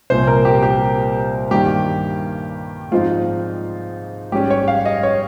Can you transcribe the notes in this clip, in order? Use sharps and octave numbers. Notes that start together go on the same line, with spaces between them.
C2 A#2 F3 C5
A#4
G4
G4
G2 D#3 A#3 G4
G#2 F3 C4 D#4 F4
G#2 G3 C#4 G4
C#5
F5
D#5
C#5